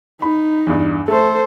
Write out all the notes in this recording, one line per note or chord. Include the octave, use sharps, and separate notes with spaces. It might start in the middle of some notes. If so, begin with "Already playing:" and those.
D#4 B5
E2 G2
A3 A4 C5